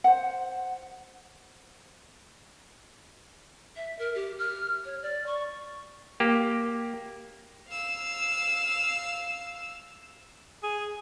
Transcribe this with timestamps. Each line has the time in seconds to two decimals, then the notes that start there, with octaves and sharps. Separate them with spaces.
0.04 C5 F#5
3.76 E5
3.99 A#4
4.15 G4
4.39 F6
4.85 C#5
5.02 D5
5.26 C#6
6.20 A#3 G4
7.69 F5 E6
10.63 G#4